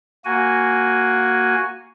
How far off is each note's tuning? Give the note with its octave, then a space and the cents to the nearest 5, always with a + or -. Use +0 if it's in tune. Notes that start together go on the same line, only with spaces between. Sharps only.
A#3 -5 F#4 +0 G#5 +0